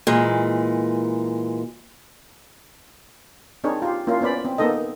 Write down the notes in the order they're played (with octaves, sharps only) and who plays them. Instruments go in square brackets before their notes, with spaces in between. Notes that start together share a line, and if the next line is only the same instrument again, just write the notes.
[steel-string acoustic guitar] A#2 E3 G#3
[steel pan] C4 D4 D#4 G#4 A#4 C#5
F4 G4
A#3 C#4 E4 F4
B3 C#4 C5 D5 B5
C4
A#3 B3 D#4 A4 D#5